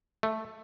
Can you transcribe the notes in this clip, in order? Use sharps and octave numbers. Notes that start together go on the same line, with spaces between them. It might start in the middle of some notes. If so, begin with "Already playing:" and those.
A3